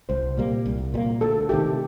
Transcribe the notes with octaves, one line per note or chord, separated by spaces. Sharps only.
C2 C5
A#2 G3 A#3
C2
A#2 G3 A#3
D2 A4
C3 D#3 A3 G4